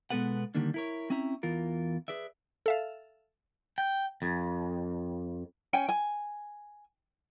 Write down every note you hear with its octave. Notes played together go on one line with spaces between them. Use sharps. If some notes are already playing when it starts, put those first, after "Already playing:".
B2 G#3 B3 A4 B4 F#5
D3 D#3 G3 A#3 D4
E4 A#4 C#5
C4 C#4 E4 E5 A#5
E2 E3 F4 A#4
G#4 B4 D5 E5
A4 E5 F5
G5
F2
C#4 G5 G#5
G#5